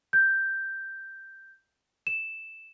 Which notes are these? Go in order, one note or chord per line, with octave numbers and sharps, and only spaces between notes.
G6
E7